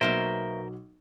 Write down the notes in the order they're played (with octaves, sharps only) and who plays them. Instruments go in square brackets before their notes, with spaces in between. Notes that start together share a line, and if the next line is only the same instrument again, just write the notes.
[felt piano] B1 F#3 [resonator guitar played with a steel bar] B2 A#3 E5 [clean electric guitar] A#4 C5